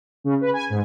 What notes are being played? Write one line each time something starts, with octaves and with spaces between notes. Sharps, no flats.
C#3
B4
G#5
G#2